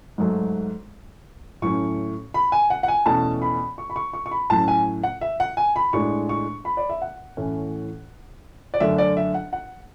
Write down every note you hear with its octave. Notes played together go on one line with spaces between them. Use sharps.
G#2 F#3 A3
A2 F#3 A3 C#4 C#6
B5
G#5
F#5
F#5
G#5
E2 B2 A3 C#4 A5
B5
C#6
B5
C#6
C#6
C#6
B5
A2 F#3 C#4 A5
G#5
F#5
E5
F#5
G#5
B5
A2 G#3 D4 C#6
C#6
B5
D5
E5
F#5
A2 E3 A3 C#4
D5
F#2 D3 A3 D4 E5
D5
E5
F#5
F#5